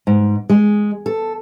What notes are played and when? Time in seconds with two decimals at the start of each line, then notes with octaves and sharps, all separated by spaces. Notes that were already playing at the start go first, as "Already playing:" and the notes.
0.07 G#2
0.49 G#3
1.06 A4